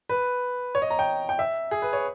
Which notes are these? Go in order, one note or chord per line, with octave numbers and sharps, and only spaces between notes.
B4
C#5
D#5
A#5
G5
G5
E5
G#4
B4
C#5